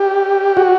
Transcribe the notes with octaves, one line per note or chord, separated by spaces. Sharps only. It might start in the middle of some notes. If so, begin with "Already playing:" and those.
Already playing: G4
F#4